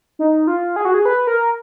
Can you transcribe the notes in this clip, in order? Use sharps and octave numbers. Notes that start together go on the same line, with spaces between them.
D#4
F4
G#4
F#4
G#4
B4
A#4